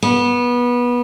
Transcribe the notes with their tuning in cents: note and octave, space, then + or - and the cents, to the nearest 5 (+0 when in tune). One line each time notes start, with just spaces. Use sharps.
B3 -20